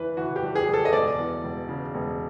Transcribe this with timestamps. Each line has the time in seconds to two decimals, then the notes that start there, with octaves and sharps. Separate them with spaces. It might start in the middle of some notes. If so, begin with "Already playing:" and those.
Already playing: G2 E3 B4
0.17 E3 F#4
0.36 G4
0.43 G2
0.55 G#4
0.68 G2
0.74 A4
0.85 D#5
0.93 E1 D5
1.19 E2
1.44 E1
1.69 C#3
1.95 E1